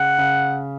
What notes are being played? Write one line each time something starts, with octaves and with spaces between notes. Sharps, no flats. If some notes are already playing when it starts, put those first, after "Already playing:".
Already playing: C#3 F#5
C#3